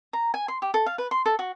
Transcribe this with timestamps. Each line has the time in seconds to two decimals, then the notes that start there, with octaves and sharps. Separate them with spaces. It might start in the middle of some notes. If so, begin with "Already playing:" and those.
0.13 A#5
0.34 G#5
0.48 C6
0.62 G4
0.74 A4
0.86 F5
0.98 B4
1.11 C6
1.26 A4
1.39 F#4